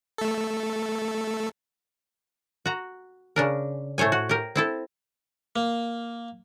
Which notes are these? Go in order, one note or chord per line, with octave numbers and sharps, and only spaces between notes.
A3 A4
F#4 A#5
C#3 D4 A#4
A2 A3 C5 C#5 G#5
F#4
G4 A#4
C4 E4 A4
A#3